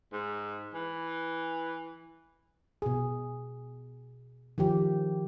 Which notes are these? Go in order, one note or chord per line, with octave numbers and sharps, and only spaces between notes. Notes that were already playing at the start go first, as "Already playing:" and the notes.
G#2
E3
B2 G#4
D#3 F3 G4